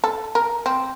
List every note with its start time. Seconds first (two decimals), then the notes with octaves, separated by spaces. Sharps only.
0.04 A4
0.35 A#4
0.66 C4